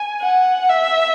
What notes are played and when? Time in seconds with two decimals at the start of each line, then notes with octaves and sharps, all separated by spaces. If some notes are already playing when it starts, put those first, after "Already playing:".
Already playing: G#5
0.21 F#5
0.69 E5